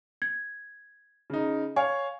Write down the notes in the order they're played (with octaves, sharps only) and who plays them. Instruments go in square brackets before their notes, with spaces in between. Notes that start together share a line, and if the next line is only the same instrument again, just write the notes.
[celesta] G#6
[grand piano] C#3 D#4
[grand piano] C#5 F5 [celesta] G#5